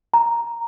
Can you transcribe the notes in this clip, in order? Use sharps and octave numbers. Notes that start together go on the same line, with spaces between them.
A#5